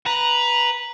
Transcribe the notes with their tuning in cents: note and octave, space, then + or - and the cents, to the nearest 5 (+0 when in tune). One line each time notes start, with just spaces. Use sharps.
B4 -5 A#5 +10